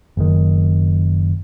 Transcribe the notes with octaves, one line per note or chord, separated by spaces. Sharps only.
F#1 D#3